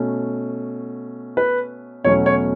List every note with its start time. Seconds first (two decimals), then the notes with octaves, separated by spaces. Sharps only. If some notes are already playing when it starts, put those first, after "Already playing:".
Already playing: B2 A3 C#4
1.37 B4
2.04 E2 B2 F#3 A3 C#4 C#5
2.26 C#5